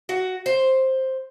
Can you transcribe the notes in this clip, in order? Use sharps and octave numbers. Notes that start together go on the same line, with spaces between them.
F#4
C5